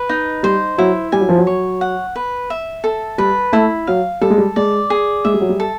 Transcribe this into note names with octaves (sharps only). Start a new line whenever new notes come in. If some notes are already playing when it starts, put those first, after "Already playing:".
Already playing: B4
D#4
G3 C5
F#3 E4
G3 G#5
F#3
F3
F#3
C#5
F#5
B4
E5
A4
G3 B4
A3 E4
F#3 F5
G3 A4
G#3
G3
G#3 D5
G#4
G#3 E5
G3
F#3
G3
A4